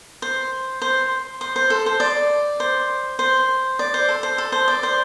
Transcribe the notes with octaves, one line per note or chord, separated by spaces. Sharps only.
C5
C5
C5
C5
A4
C5
D5
C5
C5
D5
C5
A4
C5
A4
C5
D5
C5